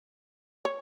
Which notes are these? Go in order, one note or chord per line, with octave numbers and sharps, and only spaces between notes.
C#5